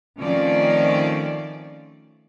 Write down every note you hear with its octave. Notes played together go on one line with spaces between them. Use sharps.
D#3 F3 A3 C4 C#4 D5